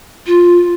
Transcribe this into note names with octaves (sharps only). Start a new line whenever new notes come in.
F4